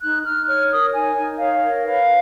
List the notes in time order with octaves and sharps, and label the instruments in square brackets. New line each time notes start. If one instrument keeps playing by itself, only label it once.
[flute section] D#4 F#6
D#4 F6
C#5 F6
A#4 D#6
D#4 G#5
D#4
C#5 F5
A#4
B4 F5